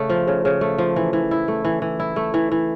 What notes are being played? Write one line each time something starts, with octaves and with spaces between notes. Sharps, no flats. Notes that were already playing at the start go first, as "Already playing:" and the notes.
Already playing: C#3 A3
F3
C#3
C#3
A3
F3
E3
E3
E4
A3
E3
E3
E4
A3
E3
E3